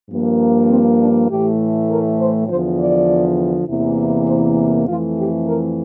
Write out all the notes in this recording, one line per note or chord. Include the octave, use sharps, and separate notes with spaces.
G2 F3 A#3
C4
D4
A2 E3 A3 G4
A#4
C5
E2 D3 F3 C5
D5
E2 C3 E3 A#3
C5
F2 E3 A3 F4
G4
A#4